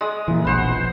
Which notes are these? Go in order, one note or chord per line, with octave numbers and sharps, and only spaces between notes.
G#3 D#6
A#2 E3
E1 A#1 B4 C5 F#5